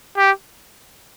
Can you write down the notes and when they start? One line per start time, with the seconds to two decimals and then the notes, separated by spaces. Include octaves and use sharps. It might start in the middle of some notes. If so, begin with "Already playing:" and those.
0.18 G4